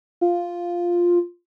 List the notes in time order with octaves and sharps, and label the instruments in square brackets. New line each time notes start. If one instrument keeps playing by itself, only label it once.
[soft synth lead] F4